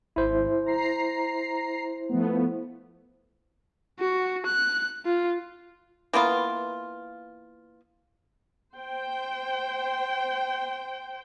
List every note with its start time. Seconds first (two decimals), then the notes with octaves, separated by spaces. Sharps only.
0.16 G#1 E4 C5
0.66 A#5 C7
2.09 F3 A3 B3
4.00 F#4
4.46 F#6
5.06 F4
6.13 E3 A#3 B3 F4
8.75 C5 G5